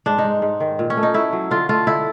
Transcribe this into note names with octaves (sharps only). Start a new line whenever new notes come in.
G#2 D4
D#4
G#3
G#2
D#3
A#2
C#4
A3
D#4
A3 E4
F#3
D3 F4
A3 F4
D3 E4